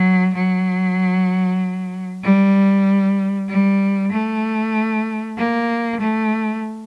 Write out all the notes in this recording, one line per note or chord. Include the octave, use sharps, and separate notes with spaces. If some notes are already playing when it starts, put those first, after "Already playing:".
Already playing: F#3
F#3
G3
G3
A3
A#3
A3